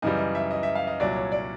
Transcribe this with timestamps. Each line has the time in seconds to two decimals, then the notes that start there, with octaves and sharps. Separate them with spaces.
0.02 F#2 C#3 E3 G3 D#5
0.19 D#5
0.35 E5
0.51 D#5
0.63 E5
0.75 F5
0.87 D#5
1.00 C2 A#2 F#3 D5
1.16 C#5
1.32 D5